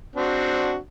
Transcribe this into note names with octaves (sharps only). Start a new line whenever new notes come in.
C4 D4 F#4